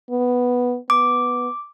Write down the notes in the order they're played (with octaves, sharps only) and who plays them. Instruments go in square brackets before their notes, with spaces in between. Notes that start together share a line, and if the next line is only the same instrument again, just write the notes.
[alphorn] B3
[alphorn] B3 [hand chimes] D6